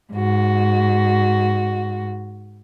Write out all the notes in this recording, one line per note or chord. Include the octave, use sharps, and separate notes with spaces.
G#2 F#4